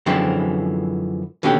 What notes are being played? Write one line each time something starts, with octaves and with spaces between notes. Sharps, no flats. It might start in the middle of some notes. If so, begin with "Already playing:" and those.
F#2 D3 E3 F3 G#3 C4
D#2 B2 D3 C#4 G4